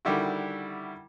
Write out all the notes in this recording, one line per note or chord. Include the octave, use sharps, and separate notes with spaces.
D3 D#3 G3 E4 F#4